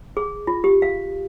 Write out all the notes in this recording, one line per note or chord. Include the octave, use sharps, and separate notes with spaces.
G#4
F4
G4
F5